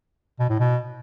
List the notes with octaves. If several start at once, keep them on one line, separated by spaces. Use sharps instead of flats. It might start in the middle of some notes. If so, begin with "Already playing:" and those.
B2
A2
B2